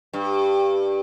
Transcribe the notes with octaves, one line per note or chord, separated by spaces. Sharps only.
G2